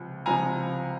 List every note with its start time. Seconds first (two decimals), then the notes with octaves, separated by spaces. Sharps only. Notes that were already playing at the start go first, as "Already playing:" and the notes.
Already playing: C#2 C3 F3
0.26 C#2 C3 F3 G#5 A#5